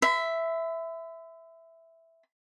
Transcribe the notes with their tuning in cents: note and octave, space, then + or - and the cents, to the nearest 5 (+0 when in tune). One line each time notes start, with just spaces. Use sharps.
E5 +0 B5 +45